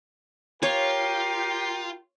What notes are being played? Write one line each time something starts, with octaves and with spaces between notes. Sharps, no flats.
F4 G4 A#4 C#5 G5 C7